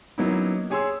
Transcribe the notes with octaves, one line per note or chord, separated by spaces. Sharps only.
F#3 A#3 B3 C#4 D#4 E4
G4 G#4 C#5 G#5 C6 E6